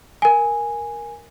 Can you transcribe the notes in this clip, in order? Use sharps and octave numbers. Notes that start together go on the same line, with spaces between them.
A#4 G#5